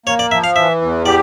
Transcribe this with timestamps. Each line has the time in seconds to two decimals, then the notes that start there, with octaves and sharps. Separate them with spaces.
0.06 A#3 C#5
0.19 D5
0.31 F3 E5
0.44 F5
0.56 E3 E5
0.81 E2
1.06 G4 D5